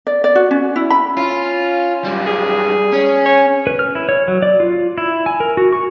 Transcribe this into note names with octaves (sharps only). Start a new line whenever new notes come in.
D5
D5
F#4
C#4
E4
B5
C#4 F4
F#2 G3
G#4
C#4
C#5
B4
F6
E4
C#5
F#3
D5
F4
E4
G#5
A#4
F#4
C#6